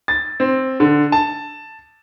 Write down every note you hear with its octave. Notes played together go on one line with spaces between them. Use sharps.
A6
C4
D3
A5